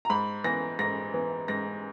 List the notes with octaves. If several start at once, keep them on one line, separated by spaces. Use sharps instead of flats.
A#5
G#2 B5
E3 B3 A#6
G#2 A#6
E3 B3
G#2 A#6